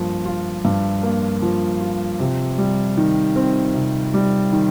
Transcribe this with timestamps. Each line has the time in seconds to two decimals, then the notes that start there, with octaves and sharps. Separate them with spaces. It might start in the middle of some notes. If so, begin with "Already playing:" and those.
Already playing: G2 F3 A#3
0.26 F4
0.65 G2
1.03 A#3
1.42 F3
1.81 F4
2.20 C3
2.58 G3
2.97 D#3
3.36 C4
3.75 C3
4.14 G3
4.53 D#3